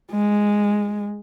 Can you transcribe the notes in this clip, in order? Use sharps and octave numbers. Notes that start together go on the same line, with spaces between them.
G#3